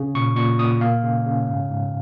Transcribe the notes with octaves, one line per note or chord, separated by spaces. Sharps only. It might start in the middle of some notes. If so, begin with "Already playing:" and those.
Already playing: C#3
A#2 C#6
A#2 C#6
A#2 D#6
A#3 F5
C#3
C#3
G#2
G#2